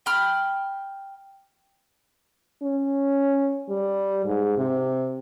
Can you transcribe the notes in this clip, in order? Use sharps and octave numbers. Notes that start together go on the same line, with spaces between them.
G5 B5 F6
C#4
G3
G#2
C3